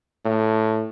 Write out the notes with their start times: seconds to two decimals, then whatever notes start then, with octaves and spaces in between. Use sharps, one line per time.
0.25 A2